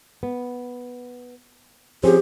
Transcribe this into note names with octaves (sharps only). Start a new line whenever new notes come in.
B3
F3 C4 C#4 G4 G#4